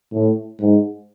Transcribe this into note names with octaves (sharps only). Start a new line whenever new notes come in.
A2
G#2